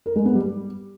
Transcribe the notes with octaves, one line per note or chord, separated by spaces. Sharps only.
A#4
G#3
B3
G3